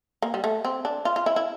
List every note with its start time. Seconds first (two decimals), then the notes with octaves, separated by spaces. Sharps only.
0.22 A#3
0.34 G3
0.44 A3
0.65 C4
0.85 D4
1.05 F4
1.16 F4
1.26 E4
1.36 E4